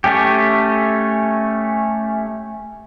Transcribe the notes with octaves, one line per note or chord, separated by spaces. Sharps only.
A3 C#4 G4